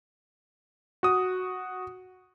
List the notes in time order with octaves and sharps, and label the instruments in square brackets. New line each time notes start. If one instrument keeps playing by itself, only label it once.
[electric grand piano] F#4 D#6